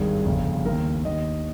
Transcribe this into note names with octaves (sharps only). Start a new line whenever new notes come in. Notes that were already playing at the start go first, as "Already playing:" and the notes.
Already playing: G#1 G2 D#3 G#4
G1 F2 C#3
D#2 D#3 A#4
D#2 D#3 D#5